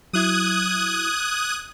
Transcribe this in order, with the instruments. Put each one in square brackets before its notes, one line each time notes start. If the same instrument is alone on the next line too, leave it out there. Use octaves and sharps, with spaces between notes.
[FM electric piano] F#3 E4 [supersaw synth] D#6 F#6 G#6